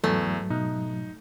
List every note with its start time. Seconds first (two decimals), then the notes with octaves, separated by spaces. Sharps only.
0.04 E2 G#2 F#3 A3 A4
0.50 B2 D#4